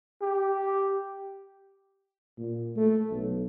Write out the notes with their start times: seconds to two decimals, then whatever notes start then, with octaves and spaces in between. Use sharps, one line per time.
0.21 G4
2.38 A#2
2.76 A3
3.11 B1